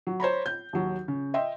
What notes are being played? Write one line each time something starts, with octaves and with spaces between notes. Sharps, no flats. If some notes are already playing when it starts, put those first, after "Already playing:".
F#3
C5 C#5 A#5 B5
G6
D#2 F#3
C#3
D#5 E5 G5 C6